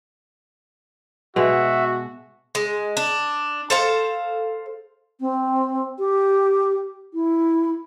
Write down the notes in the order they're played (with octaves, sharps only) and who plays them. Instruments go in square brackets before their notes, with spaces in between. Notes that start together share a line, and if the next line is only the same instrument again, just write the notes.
[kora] B2 G#3 [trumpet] F#4 [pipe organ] E5
[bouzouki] G#3
D4
A4 C5 F5
[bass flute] C4
G4
E4